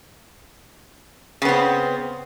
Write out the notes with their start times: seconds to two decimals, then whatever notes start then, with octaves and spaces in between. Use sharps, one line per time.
1.42 C#3
1.45 B3
1.48 C4